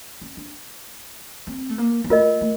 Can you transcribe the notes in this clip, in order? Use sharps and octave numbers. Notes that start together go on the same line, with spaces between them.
C#4
D4
C4
A3
A#3
A#3
A3 F4 A#4 D#5
A3